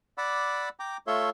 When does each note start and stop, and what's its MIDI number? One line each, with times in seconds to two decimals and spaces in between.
0.18 0.69 74
0.18 0.69 78
0.18 0.69 83
0.18 0.69 86
0.18 0.69 88
0.80 0.97 79
0.80 0.97 82
0.80 0.97 86
1.07 1.30 57
1.07 1.30 65
1.07 1.30 69
1.07 1.30 73
1.07 1.30 76
1.07 1.30 84